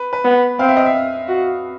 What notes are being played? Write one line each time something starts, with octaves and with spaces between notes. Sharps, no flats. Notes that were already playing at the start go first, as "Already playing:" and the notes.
Already playing: B4
B4
B3
C4 F5
E5
D#5
E5
F#4